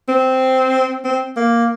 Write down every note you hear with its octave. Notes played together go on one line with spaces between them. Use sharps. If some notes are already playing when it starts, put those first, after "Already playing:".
C4
C4
A#3